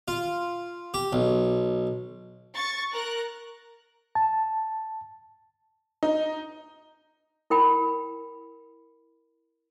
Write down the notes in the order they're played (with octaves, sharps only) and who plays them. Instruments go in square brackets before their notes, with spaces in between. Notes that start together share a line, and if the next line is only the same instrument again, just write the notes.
[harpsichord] F4
G4
B1
[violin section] C#6 A6
A#4 F#6
[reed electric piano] A5
[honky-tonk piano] D#4
[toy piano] E4 A#4 G5 B5